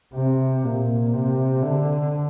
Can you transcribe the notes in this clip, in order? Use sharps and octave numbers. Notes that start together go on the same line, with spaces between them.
C3
A#2
C3
D3